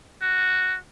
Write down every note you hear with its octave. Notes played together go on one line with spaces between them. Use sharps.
F#4